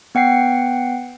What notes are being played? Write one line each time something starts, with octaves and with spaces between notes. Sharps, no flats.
B3 F#5 G5 C7